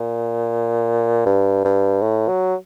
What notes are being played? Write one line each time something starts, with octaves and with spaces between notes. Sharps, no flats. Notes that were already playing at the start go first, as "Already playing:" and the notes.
Already playing: A#2
G2
G2
A2
F#3